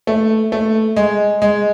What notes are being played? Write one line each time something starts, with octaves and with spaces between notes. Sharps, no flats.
A3
A3
G#3
G#3